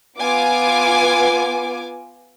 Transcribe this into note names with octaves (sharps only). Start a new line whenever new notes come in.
B3 F4 G#5 D6